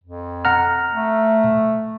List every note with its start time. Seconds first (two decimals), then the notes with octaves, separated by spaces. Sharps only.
0.04 F2
0.45 F#5 A#5 F6
0.92 A3